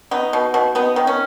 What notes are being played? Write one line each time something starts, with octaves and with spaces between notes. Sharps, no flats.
B3 D#4
B2
B2
B3 D#4
D#3
C#4